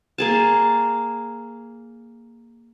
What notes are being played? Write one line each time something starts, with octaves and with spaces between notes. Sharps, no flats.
A#3 G#4 A5